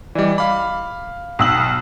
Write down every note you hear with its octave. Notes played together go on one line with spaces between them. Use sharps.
E3 G3 D5 D#5
F5 B5 D6
B1 G5 D#6 E6 F#7